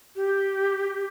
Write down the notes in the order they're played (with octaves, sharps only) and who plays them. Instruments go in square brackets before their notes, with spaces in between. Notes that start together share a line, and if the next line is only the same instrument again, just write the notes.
[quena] G4